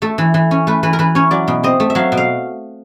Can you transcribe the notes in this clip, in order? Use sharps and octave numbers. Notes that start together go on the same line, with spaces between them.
A3 A4
E3
E3
C#4
A3 B4
E3 B4
A#4
E3 B4
C#4 C#5
F#3 D5
B2
C4 D#5
A3
E5
F#3 F5
B2
F5